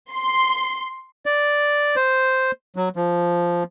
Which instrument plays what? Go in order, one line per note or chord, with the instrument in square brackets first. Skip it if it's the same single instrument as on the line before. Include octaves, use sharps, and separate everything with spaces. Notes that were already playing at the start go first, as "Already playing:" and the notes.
[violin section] C6
[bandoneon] D5
C5
F#3
F3